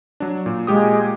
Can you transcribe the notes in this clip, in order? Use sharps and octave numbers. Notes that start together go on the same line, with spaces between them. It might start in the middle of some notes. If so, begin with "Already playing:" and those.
F#3 D4
A#2
A#2 G#3 G4 D#6